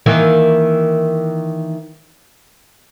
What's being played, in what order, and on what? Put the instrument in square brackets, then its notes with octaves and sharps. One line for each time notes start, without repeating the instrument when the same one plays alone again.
[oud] D#3 E3 A#3